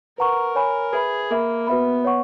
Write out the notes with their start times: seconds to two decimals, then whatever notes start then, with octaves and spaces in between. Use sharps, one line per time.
0.18 A#4 B4 F#5 A#5 C#6
0.55 C#5 G#5 B5
0.93 G#4 B4 E5 B5
1.30 A#3 A#4 E5 B5
1.67 B3 F#4 B4 E5 B5
2.05 C#5 F#5 C#6